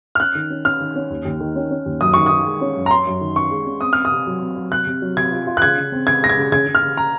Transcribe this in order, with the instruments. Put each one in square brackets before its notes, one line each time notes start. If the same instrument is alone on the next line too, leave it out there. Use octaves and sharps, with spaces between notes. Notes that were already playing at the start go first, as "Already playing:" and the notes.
[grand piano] F6
[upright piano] C#4 [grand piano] F#6
[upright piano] D#3
C#4
[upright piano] C#4 [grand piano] F6
[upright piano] D#3
C#4
D#2
D#2
D#3
C#4
C#4
D#2
[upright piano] F#2 [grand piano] D#6
[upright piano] D#3 [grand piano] C#6
[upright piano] D#3 [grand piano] D#6
[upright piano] G#3
C#4
F#2
[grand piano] A#5
[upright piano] C#4 [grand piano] C6
[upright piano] F#2
D#3
[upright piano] C#4 [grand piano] C#6
[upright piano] G#3
C#4
[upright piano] C4 [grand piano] D#6
[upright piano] C4 [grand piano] F6
[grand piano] D#6
[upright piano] C3
F#3
C4
F#3
[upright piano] C3 [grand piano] F#6
[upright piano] C3
F#3
[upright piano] C3 [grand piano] G#6
[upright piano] F4
F4
[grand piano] F#6
[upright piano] C#3 [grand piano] G#6
[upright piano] C#3
C4
[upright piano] C#3 [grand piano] G#6
[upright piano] G#3 [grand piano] A#6
[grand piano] G#6
[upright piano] C#3
[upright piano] C#3 [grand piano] G#6
[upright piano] C#3
[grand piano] F6
[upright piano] C#3
[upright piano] C#3 [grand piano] A#5